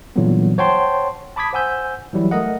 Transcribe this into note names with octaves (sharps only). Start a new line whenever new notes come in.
A#2 D3 E3 F#3 G3 B3
C5 C#5 F#5 G5 A5 C6
A5 B5 D6 D#6 G#6 B6
C5 F#5 G#5 E6 G6
E3 F#3 G3 E4
A3 A#4 D#5 F#5